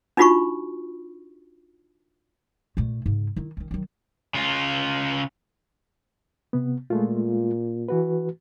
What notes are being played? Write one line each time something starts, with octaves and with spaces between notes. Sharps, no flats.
D4 D#4 F4 F#4 B5 C#6
A#2 A3
G#2 C#3
D#3 E4
D#3 C#4
D#3 F#3
C#3 F4
C3 B3
A#2 G#3 A3 F4
E3 F#4 B4